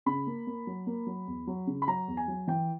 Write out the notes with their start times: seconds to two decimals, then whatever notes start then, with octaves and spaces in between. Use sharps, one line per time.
0.06 C#3 B5
0.27 A#3
0.47 A#3
0.67 F#3
0.87 A#3
1.07 F#3
1.27 E2
1.47 F#3
1.67 C#3
1.82 B5
1.87 F#3 A#5
2.08 E2
2.17 G#5
2.28 F#3
2.47 E3 G5